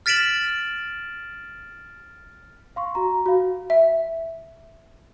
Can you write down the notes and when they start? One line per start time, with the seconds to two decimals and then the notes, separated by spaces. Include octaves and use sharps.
0.06 F6 A6 B6 D7 E7 F#7
2.76 F5 C6 C#6
2.95 F#4 A#5
3.26 F#4 F5
3.70 E5